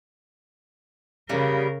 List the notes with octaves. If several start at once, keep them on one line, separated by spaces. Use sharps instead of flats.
C#3 G3 A#3 B3 A#4